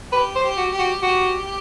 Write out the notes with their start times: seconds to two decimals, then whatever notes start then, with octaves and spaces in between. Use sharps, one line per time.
0.12 G4 B4
0.35 C5
0.42 G4
0.57 F#4
0.72 G4
0.79 F#4
1.02 F#4 G4